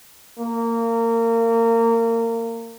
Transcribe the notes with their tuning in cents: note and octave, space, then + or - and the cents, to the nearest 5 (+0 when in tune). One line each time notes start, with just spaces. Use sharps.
A#3 -25